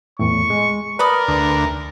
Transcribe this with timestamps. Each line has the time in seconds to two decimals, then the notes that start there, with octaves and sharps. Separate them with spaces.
0.19 E2 A2 C#6
0.50 G#3
0.99 A#4 B4 D5 B5 D#6
1.28 D2